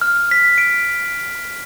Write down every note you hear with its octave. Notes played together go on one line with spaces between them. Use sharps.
F6
B6
D7